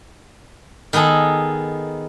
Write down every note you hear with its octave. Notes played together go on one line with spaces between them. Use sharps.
D#3 B3 D#4 G#4 A4